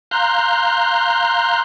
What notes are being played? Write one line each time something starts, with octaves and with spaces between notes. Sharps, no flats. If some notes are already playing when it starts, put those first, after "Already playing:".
F5 A#5 C6 F#6 G6